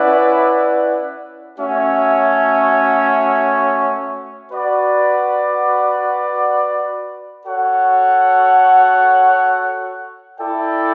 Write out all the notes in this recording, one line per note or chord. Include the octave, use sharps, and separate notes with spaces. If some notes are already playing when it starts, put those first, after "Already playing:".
Already playing: C#4 E4 B4 D5 F#5
A3 C#4 F#4 C#5 E5
F#4 B4 D5 F#5
F#4 A4 C#5 F#5
E4 A4 D5 G5